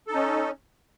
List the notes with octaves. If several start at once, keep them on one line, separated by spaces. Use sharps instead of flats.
C#4 D#4 A4